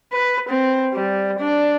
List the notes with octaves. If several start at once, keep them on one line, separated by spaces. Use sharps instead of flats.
B4
C4
G3
D4